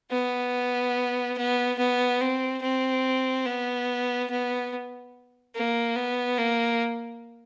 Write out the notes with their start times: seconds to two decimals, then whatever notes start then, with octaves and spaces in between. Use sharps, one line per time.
0.11 B3
1.37 B3
1.78 B3
2.21 C4
2.62 C4
3.46 B3
4.30 B3
5.55 A#3
5.96 B3
6.38 A#3